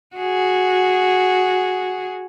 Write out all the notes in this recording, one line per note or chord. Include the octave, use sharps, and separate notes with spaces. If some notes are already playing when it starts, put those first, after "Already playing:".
F#4 G#4